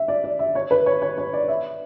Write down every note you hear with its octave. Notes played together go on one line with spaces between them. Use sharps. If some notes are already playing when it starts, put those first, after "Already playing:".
Already playing: E5
D5
D5
E5
C#5
B4
C#5
C#5
C#5
D5
E5